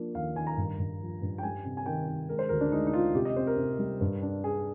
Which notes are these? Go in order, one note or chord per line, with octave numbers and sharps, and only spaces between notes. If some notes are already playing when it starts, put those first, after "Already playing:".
Already playing: F3 A#3 D4
D#2 F5
D#3 G#5
A#5
G2
G2
F3
G2
G5
G3 G#5
C3
G#5
D#3 G5
D#3
G#3 A#4
C5
D2 A#4
D4
G#3 D#4
D#4
G#3 F4
C3 G4
D#5
C4 C5
A#4
C3
G3
G2
D4
D4 G#4